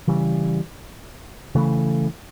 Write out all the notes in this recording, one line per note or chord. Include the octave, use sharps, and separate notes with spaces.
C#3 E3 G3
C#3 E3 A3